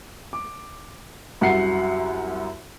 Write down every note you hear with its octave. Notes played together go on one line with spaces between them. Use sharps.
D6
C2 F#2 F#5 C7